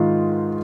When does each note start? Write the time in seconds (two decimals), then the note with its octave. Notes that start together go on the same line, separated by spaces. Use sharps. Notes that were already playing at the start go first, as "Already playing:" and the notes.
Already playing: G#2 D#3 F4 F5